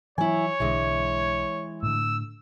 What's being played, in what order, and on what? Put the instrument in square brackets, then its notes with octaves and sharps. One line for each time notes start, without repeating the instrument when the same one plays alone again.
[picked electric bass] E3 F#3 [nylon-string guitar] E4 G#5 [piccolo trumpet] C#5
[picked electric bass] B1 D3 [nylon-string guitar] E3 G#3
[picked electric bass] A2 D3 [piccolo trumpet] E6